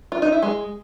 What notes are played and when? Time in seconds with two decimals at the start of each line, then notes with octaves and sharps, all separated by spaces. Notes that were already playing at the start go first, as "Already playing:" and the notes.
0.12 F4
0.22 D#4
0.32 E4
0.42 G#3